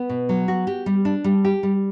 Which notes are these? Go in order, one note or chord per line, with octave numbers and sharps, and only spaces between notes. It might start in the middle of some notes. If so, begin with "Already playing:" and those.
Already playing: B3
B2
F#3
F#4
G4
G3
D4
G3
G4
G3